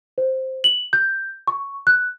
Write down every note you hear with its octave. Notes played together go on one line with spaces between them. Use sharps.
C5
F#7
G6
C#6
F#6